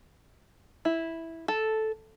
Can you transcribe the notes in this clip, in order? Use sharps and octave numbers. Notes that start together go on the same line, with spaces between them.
E4
A4